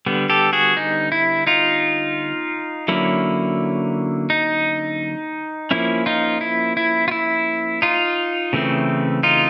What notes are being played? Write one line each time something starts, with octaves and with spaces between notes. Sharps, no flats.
D3 G3 B3
G4 A4
F#4 G#4
D#4
E4
D#4 F4
D3 F#3 A#3 C#4 E4
D#4
F3 A#3 C#4 E4
D#4 F4
E4
E4
F4
E4
D#4 F4
C#3 E3 A3 C4
D#4 F4